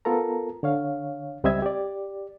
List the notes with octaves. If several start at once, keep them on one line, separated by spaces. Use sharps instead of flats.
B3 F4 A4 A#4 A#5
D3 C#5 F5
C#2 G3 C4 D#5 E5 G#6
G4 D5